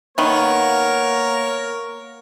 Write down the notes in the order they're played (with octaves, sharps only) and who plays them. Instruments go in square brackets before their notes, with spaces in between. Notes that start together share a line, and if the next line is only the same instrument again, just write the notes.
[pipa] D#3 B3 [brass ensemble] A#3 A#4 [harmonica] C#5